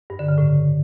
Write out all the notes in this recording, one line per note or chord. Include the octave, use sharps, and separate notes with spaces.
G2
D3
C#3
A2